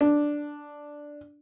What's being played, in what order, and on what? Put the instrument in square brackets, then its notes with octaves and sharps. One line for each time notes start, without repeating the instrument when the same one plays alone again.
[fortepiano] D4